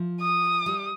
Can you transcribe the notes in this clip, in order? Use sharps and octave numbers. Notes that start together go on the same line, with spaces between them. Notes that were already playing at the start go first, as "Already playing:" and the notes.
Already playing: F3
D#6
G3